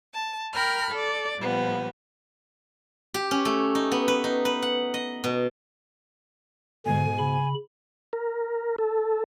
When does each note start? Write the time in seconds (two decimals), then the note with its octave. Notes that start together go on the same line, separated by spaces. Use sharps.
0.13 A5
0.53 A#4 G5 B5 F6
0.93 A4 D5
1.39 A#2 F3 G3 B3
3.14 G4
3.31 C#4
3.45 A3
3.75 D#4
3.92 B3
4.08 B4
4.24 D#4
4.45 B4
4.62 F#5
4.94 D#5
5.24 B2
6.86 G#2 B2 D3 G#5
7.18 C#3 B5
8.13 A#4
8.78 A4